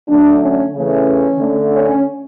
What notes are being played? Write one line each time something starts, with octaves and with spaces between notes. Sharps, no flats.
D3 F#3 A3 D4
C#4
C#3 E3 A3 C#4
D3 A3
C#4